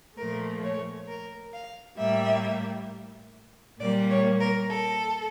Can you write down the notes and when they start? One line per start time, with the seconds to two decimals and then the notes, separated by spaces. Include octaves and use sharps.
0.17 A#2 F3 A3 A#4
0.63 C#5
1.08 A#4
1.53 F5
1.99 A2 G3 A#3 E5
3.80 A#2 G3 A#3 D5
4.10 C#5
4.40 A#4
4.70 A4